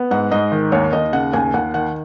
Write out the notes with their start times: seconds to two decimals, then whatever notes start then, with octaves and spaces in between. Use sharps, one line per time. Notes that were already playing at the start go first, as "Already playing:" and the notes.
Already playing: B3
0.11 G#2 F#5
0.31 G#2 D#5
0.52 D#3
0.72 D#2 C#5
0.93 D#2 D#5
1.13 C#3 F#5
1.33 D#2 G#5
1.54 D#2 F#5
1.74 D#3 F#5